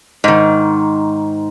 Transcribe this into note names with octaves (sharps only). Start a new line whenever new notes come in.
G#2 D#3